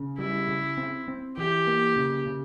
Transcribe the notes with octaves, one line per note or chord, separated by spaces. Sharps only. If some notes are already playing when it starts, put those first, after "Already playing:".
Already playing: C#3
G3 E4
C#3
C4
C4
E3 G4
A#3
C#3
C#3